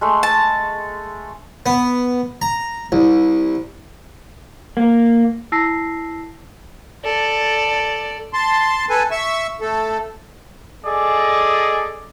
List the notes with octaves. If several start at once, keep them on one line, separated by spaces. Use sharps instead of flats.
G#3 A3 C6
A5
B3
A#5
C2
A#3
E4 A5 E6 A#6 C7
A4 D5
A5 C6
A4 B4 G#5
E5 C#6 E6
A3 A4
G#4 A4 D5 D#5